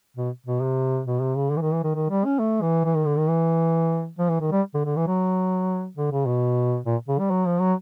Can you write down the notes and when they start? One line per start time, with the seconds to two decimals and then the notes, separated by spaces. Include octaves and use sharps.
0.16 B2
0.46 B2
0.61 C3
1.06 B2
1.20 C3
1.36 C#3
1.50 D3
1.57 E3
1.61 D#3
1.73 E3
1.84 D#3
1.95 D#3
2.10 G3
2.25 C#4
2.39 A3
2.62 E3
2.84 E3
2.95 D#3
3.06 D3
3.18 D#3
3.29 E3
4.18 F3
4.29 E3
4.41 D#3
4.51 G3
4.74 D3
4.85 D3
4.96 E3
5.07 F#3
5.97 D3
6.11 C#3
6.26 B2
6.86 A#2
7.08 C#3
7.19 G3
7.30 F#3
7.46 F3
7.60 F#3